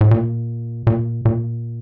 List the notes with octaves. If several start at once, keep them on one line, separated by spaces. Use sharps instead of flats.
A2
A#2
A#2
A#2